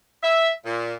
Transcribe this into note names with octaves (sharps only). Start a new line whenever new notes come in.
E5
A#2